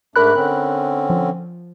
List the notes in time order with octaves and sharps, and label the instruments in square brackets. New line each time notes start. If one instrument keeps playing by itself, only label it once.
[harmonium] G#2 A3 D4 [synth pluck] A#4 B5 F#6
[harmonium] D3 C4 C#4
[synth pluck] F3